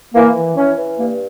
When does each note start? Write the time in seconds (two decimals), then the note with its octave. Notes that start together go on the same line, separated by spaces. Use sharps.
0.14 E3 A#3
0.36 E3
0.56 E3 C#4
0.76 E3
0.98 G2 A#3